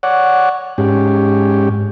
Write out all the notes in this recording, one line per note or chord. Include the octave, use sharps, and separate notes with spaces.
C#5 D5 F#5
G#2 C#4 G4